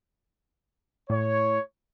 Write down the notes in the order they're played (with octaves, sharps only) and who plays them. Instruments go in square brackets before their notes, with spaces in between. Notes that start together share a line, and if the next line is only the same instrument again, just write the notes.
[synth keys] A2 [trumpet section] C#5